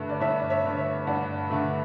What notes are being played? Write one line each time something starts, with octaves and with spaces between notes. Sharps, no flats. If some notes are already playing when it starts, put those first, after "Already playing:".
Already playing: G2 D3 A3
D5
G2 C#5 E5
D5
C#5 E5
D3 A3
C#5 E5
G2 D5 F#5
D3 A3